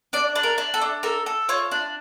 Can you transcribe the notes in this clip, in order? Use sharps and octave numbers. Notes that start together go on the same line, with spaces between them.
D4 D5
D4
A#4
D4
A4
D4
A4 A#4
A4
F4 C#5
D4